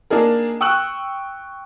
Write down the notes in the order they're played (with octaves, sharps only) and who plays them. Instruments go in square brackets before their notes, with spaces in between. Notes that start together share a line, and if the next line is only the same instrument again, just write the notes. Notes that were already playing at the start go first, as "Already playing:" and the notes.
[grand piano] A#3 D4 D#4 G#4 A#4
G5 C#6 D#6 E6 F#6 F#7